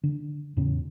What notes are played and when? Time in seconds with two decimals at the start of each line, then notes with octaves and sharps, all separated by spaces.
0.03 D3
0.57 E2 A2 C#3 C#4